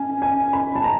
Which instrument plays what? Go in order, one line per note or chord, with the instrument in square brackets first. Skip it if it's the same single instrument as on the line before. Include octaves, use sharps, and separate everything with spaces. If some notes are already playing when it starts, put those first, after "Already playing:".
Already playing: [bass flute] C#4 [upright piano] G#5
[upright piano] G#5
B5
A5
A#5